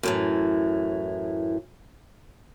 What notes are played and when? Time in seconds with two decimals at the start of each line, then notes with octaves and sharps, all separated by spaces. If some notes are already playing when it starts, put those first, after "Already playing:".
0.03 F#2 A2 E3